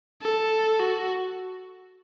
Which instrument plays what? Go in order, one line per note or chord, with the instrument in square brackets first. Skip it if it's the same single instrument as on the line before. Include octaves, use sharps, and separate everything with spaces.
[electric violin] A4
F#4